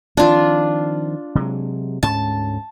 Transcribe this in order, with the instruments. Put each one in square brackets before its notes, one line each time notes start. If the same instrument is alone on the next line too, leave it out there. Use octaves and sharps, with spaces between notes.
[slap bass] D#3 F3 C4 [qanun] D4 F4
[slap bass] C3 F#3 G#3
[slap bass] D2 G#2 C#4 [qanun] A5